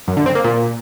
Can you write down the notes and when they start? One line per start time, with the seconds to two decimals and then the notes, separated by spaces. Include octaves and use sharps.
0.08 F#2
0.17 D3
0.26 C4
0.35 A#3
0.44 A#2